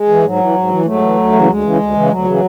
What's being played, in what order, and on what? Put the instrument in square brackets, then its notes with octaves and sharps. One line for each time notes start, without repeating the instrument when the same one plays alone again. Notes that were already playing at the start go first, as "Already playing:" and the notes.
Already playing: [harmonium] G#3
E3
G#2 F#3
E3
G#2
E3
G#2 F#3 A3
E3
D2
C#3 E3
A3
D2 G#3
C#3 E3
D2
C#3 E3
D2 F#3
C#3 E3